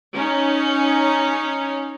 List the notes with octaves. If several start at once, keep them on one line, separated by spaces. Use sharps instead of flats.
C#4 D#4